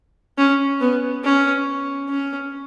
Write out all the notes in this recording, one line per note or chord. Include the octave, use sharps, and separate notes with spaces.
C#4
B3
C#4
C#4